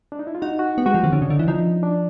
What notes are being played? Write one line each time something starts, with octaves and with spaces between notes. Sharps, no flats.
D4
D#4
E4
F4
D#4 F#4
F#4
B3 G4
G#3 F#4
F3
D#3 C4
D3 C#4
C#3 D4
D3 D#4
E3 E4
F3 D#4
D4